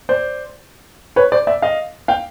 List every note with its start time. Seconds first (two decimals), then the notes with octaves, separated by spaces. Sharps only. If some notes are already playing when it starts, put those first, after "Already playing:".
0.09 C5 D5
1.16 B4 C#5
1.32 C5 D5
1.47 D5 E5
1.62 D#5 F5
2.08 F5 G5